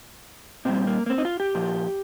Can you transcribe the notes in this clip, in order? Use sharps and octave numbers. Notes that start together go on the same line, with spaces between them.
A#2 G3 C4
A#3
A#3
C4
D#4
F4
G4
A#2 F3